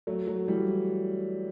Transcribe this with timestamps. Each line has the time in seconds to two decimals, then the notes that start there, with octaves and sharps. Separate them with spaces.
0.07 F#3 A3
0.27 F#3 A3
0.48 E3 G3